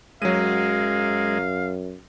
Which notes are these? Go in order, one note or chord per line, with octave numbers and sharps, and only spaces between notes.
F#2 F#3 G#3 F5 D#7